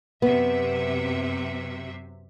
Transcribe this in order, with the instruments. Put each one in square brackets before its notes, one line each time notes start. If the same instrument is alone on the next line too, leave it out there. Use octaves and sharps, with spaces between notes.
[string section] F#2 C3 E5 [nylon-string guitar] B3